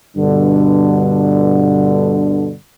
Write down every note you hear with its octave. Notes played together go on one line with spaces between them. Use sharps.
G2 B2 D3